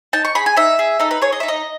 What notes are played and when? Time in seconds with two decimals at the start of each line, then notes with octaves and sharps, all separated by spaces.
0.13 D#4 A5
0.25 C#6
0.35 G#4 B5
0.46 G#5
0.56 D#4 E5
0.79 G#4
0.99 D#4 A4
1.11 B4
1.22 G#4 C#5
1.32 D#5
1.40 D#4 E5
1.48 D#5